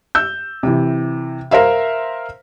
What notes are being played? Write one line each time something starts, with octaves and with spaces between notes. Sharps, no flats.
E6 G6
C3 E3
A#4 C5 E5 F5